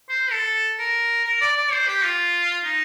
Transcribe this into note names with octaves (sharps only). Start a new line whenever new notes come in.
C5
A4
A#4
A#4
D5
D5
C5
G4
F4
D#4